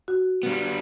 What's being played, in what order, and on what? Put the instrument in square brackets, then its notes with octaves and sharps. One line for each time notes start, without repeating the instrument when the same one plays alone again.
[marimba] F#4
[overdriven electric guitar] G3 B3